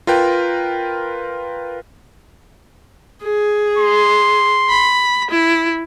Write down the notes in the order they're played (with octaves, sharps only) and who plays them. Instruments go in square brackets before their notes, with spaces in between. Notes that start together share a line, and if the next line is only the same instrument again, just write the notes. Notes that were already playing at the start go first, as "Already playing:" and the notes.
[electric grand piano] F4 A#4 B4 G5
[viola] G#4
[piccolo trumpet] C6
[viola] B5
E4